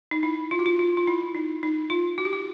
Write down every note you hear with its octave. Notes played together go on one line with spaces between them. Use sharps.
D#4
E4
F4
F#4
F4
F4
F4
E4
D#4
D#4
F4
F#4
G4
F#4